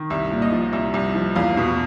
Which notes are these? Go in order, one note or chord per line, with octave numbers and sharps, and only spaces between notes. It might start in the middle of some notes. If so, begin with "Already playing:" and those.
Already playing: D#3
C2 E5
A#2
D#5
F3
C2 E5
C2
F3
E2 F5
B2